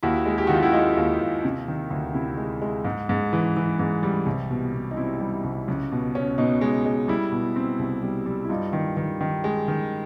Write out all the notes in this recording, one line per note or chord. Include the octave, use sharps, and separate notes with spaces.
D#2 E4 F#4
G#3
G4
D#3 F#4
F4
E4 F#4
G#3 D#4 F4
D#2
D#2
C3
D#3
D2
C3 E4
G#3
G#3
G#2
G#2
E3
E3
G#2
G3
C2
B2
B2
D#4
C4 E4
G3
C2
C#2
B2
C#4
B2 D#4
G#3
G#3
G3 E4
B2
C4
C2
G3
G3
E4
G2 D#4 F4
D#3
D#3
D#3
G#3
D#3